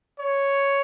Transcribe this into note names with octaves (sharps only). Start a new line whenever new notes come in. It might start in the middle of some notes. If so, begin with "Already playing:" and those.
C#5